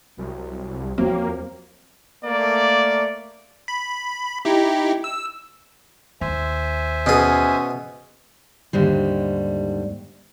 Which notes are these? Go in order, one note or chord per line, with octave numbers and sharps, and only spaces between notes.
C2 F#3
E2 F3 F#3 A#3 C4
A3 A#3 D5
B5
D#4 E4 G4
E6
D#2 C5 E5 G#5
B2 C#4 G#4
D#2 G#2 D3 G3